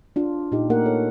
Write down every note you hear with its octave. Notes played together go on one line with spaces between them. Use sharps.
D4 F4
A#2 D#4 G4
A3 A#3 G4 A#4 F#5
A4 C#5